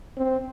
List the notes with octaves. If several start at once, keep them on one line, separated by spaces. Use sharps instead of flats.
C4